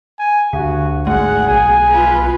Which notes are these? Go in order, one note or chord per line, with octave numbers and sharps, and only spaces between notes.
G#5
D2 D3 F#4
G#1 A3 G#4 F#5
B1 G#5
F4 B4